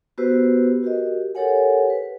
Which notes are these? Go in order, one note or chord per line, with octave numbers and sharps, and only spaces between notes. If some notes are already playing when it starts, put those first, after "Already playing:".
B3 F#4 G4 B4 C5 E6
F#4 G4 A#4 D#5
G4 A4 A#4 C#5 F#5 G#5
B4